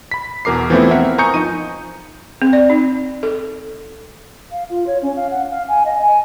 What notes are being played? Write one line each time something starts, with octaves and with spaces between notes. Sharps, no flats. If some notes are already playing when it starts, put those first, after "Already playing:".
B5 B6
E2 B2 A#4 D6 C7
E3 F3 A3 B3 C4 E4
C4 A#4 E5 F#5
G#5 A#5 C#6 D#6 G6 C#7
F3 D#4 D#7
C4
D5
D#4
A4
F5
F4
C#5
C#4
F5
F#5
F5
G#5
D#5
G#5